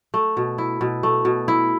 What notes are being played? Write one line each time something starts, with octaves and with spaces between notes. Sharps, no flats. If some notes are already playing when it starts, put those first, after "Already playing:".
A3
B2
E4
B2
A3
B2
E4